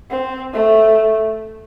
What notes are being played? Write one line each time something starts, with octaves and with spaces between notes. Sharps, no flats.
C4
A3